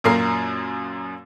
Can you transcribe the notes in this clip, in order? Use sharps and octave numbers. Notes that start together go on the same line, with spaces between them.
F#2 A#2 A#3 A#4 C7